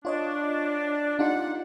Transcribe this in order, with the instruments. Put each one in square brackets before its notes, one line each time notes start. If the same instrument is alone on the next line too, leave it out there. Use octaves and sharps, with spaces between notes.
[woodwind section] D4 [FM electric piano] F4 C#5 D#5
[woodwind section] A#3 G4 F#5 [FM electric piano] D4 D#4 F4